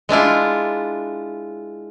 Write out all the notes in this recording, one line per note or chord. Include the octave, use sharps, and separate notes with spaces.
G#3 D4 E4 F4